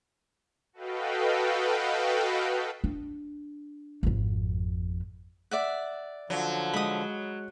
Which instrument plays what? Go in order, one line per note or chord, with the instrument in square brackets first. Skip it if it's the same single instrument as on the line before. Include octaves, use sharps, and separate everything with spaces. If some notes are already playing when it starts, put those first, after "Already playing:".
[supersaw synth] F#4 A4 B4 D#5 F5 G5
[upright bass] D4
G#1 F2
[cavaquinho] D5 E5 F#5
[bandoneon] D3 F3 [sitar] F#3
[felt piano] G#3 [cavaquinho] B5 D#6